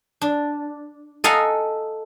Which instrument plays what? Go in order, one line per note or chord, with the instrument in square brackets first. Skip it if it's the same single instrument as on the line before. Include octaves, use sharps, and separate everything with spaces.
[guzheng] D4
A4 D#5 F5 F#5 G#5 A#5